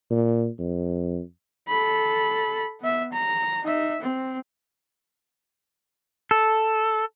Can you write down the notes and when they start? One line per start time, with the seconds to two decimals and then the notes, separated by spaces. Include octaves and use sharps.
0.11 A#2
0.59 F2
1.68 A4 B5
2.80 B3 E5
3.13 A#5
3.63 D#4 E5
4.01 C4
6.31 A4